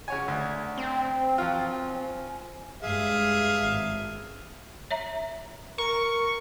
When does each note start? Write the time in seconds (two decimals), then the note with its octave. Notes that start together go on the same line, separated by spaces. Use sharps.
0.08 C#3 C#5 F#5 G#5
0.28 D2
0.78 C4 G5
1.38 F3 F#3 F4
1.86 G#5
2.82 G2 G#3 G#4 E5 F5
3.62 G#1
4.91 C#5 E5 A#5
5.78 A#4 C#6